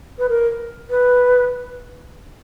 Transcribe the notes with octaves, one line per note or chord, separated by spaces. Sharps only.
B4
A#4
B4